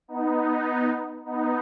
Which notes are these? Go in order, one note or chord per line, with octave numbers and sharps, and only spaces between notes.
B3 D#4
B3 D#4